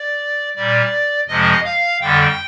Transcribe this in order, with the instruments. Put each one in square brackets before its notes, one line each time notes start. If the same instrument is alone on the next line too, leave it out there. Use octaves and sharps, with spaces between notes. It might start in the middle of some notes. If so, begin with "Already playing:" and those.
Already playing: [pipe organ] D5
A#2 G3 D5
F2 C3 F3 G#3 D#5
F5
F2 D3 G3 G5